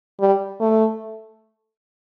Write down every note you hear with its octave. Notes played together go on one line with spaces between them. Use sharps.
G3
A3